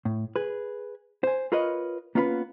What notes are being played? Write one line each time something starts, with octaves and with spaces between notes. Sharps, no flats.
A2
G#4 B4
C5 G#5
F4 A#4 B4 C#5 D#5
A#3 B3 C#4 F4 G#4 B4